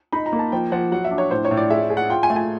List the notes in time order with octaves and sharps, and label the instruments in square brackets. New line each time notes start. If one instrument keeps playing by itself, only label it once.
[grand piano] D#4 [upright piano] B5
[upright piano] A#5
[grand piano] A#3
[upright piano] A5
[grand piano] F3 [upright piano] G5
[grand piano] F3 [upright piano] F#5
[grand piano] F#3 [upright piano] F#5
[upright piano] E5
[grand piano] D4
[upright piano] C#5
[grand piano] A2 [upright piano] C5
[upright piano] C#5
[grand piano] A2
[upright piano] D5
[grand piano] G#4 [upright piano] E5
[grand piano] G#4
[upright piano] F#5
[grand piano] F4 [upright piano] G5
[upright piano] G#5
[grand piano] A3
[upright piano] G#5